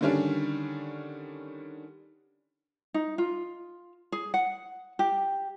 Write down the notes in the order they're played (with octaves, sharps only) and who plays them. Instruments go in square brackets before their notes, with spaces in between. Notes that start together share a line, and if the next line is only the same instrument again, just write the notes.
[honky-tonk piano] D3 D#3 G3 C#4 D4
[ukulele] D#4
F4
G#4
F#5
G4